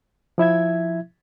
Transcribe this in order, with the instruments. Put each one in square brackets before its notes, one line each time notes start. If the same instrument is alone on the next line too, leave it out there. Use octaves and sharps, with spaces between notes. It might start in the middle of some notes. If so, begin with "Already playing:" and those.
[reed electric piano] F3 E4 E5 G#6